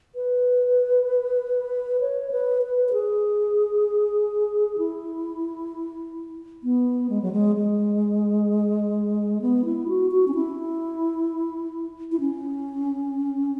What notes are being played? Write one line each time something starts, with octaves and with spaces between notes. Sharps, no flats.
B4
C#5
B4
B4
B4
G#4
E4
B3
G#3
F#3
G#3
G#3
B3
E4
F#4
F#4
C#4
E4
E4
C#4